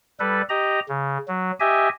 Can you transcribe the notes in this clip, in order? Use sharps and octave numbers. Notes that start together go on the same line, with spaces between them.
G3 A4 B4
G4 D#5 A#5
C#3
F#3
G4 D#5 E5 G#5